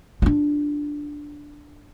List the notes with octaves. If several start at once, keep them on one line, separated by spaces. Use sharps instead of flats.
D4 F4